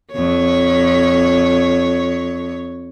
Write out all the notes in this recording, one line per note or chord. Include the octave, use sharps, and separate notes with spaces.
F2 C#5